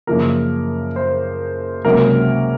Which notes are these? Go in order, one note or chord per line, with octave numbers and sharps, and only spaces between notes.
F#2 C#3 F3 A#3 A#4
C5
C#2 C3 F#3 A#3 C#4 A#4